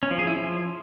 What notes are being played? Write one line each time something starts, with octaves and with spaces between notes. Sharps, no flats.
C#4
F3
G#4
E4
F3